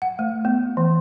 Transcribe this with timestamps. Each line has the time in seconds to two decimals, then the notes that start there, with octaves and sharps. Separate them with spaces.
0.02 F#5
0.19 A3
0.45 B3
0.77 E3